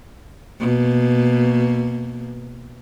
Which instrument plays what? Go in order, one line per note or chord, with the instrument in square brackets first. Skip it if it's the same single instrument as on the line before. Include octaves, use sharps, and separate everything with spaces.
[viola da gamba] B2 A#3